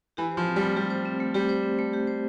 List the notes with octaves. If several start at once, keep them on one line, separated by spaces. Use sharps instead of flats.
E3 G4
C5
F3
C4
G3
A3
G3 G4
C5
C4
A3
G3 G4
C5
C4
A3
G4
C5